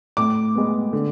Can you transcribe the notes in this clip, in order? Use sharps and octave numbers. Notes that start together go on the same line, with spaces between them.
A2 D6
G#3 B3
D3